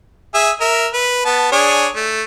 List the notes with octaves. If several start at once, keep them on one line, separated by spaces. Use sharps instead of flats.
G#4 E5
A#4 E5
B4
B3 A5
D4 G#4 C#5
A3